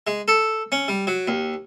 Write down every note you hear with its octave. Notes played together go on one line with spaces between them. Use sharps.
G#3
A4
C#4
G3
F#3
D#2